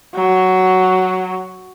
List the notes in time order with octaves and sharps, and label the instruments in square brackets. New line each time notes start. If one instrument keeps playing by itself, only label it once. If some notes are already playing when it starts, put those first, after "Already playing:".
[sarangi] F#3